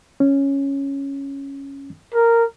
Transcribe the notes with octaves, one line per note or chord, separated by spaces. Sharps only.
C#4
A#4